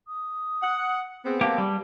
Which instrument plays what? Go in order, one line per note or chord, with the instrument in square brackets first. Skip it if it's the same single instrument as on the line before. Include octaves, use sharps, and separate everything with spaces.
[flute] D#6
[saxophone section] F#5
[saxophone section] B3 C4 [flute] G#4
[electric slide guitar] A#3 G4 [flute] A5
[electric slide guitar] G3